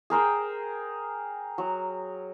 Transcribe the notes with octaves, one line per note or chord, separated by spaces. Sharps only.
G#4 A#4 C5 G5
F#3